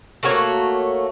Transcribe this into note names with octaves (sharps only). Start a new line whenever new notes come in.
A3 A#3 F#4 C#5